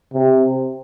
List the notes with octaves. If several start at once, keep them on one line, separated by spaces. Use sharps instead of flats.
C3